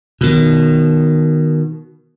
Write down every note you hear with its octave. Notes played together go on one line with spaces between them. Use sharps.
B2 D#3